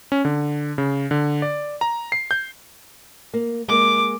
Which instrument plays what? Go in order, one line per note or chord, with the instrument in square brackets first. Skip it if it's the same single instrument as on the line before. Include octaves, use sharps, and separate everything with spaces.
[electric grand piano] C#4
D3
C#3
D3
D5
A#5
C7
G6
[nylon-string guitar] A#3
[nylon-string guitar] G#3 A#3 [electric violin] D6